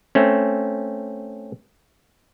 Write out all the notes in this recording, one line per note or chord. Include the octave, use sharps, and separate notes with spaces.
A3 C4 C#4